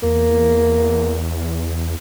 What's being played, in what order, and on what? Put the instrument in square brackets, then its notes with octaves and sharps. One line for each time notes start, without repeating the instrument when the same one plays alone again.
[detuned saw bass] E2 [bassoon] A#3